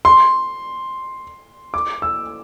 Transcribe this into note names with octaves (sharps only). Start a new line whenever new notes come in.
C6
D6
E6